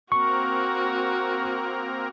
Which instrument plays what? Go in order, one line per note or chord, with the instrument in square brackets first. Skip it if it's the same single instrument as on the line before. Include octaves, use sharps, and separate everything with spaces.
[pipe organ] A#3 C4 A#4 [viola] F#4 [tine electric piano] C#6